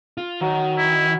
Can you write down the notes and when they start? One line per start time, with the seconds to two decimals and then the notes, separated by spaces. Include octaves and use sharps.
0.17 F4
0.41 D#3 F#3
0.78 E4